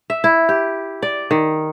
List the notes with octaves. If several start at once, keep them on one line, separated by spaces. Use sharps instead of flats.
E5
E4
G4
D5
D#3